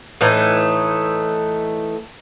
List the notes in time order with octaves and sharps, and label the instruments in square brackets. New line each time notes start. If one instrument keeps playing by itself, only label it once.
[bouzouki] A2 E3 A3 D#4